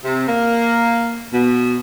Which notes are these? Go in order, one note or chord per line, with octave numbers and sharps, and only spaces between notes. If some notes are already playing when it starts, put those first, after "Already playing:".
C3
A#3
B2